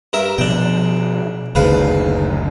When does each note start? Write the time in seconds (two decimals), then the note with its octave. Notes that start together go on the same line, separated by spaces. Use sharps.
0.13 G2 A#4 E5
0.38 B2 F3 D4 G5
1.55 F#1 D2 G#2 D#3 B4 F5